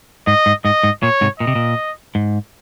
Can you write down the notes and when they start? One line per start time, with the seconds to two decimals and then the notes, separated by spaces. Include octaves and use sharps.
0.27 G#2 D#5
0.46 G#2
0.65 G#2 D#5
0.83 G#2
1.02 A#2 C#5
1.21 G#2 C3
1.39 A#2 D#5
1.47 C3
1.55 A#2
2.15 G#2